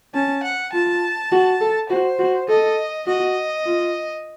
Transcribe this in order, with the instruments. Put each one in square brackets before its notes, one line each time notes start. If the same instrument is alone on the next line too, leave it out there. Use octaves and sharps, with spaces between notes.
[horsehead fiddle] C#4 [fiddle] A5
[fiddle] F#5
[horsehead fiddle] F4 [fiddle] A5
[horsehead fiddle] F#4
A4
[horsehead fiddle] F#4 [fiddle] C5
[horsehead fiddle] F#4
[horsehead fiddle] A4 [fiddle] D#5
[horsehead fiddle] F#4 [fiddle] D#5
[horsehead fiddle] F4